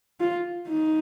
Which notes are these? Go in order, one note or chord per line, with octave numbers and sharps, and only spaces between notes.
F4
D#4